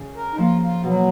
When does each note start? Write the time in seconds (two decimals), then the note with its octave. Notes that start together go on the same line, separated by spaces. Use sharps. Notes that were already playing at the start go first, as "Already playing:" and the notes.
Already playing: C#3
0.15 A#4
0.33 D#4
0.38 F3 A#3 F4
0.61 F4
0.83 B2 F#3